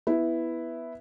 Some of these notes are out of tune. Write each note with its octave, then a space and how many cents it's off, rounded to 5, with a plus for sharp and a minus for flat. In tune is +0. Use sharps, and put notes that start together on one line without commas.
B3 +0 E4 +0